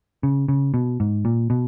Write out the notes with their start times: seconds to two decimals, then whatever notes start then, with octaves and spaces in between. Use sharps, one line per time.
0.23 C#3
0.48 C#3
0.74 B2
1.00 G#2
1.25 A#2
1.50 B2